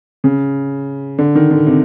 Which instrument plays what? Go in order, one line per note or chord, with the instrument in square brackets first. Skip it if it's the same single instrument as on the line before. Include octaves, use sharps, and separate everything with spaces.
[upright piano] C#3
D3
D#3
D3
C3